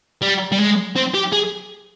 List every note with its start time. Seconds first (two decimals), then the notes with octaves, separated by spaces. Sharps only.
0.22 G3
0.52 G3
0.59 G#3
0.96 C4
1.14 G4
1.32 G#4